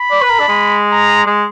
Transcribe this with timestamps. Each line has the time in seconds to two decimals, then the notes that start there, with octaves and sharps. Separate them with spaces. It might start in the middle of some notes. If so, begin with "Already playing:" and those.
Already playing: B5
0.11 D5
0.22 B4
0.30 A#4
0.40 D4
0.48 G#3
0.92 A#5
1.27 G#3